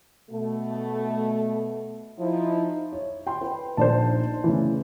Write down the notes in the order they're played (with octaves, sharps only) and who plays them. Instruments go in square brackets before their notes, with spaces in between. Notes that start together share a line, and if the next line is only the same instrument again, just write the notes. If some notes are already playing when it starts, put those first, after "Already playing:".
[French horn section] B2 A3
F3 D#4 E4
[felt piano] C#5
G5 C6
B4
[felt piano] A#1 D#4 [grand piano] C5 D5 A5
[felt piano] C#3 A3 [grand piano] E3